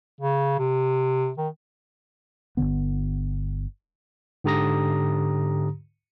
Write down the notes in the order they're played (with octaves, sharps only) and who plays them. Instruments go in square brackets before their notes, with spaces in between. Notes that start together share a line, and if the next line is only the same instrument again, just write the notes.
[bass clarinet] C#3
C3
D#3
[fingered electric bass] G1 D#2 D3 B3
[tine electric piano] G#2 D3 G4 A#5 D#6 A#6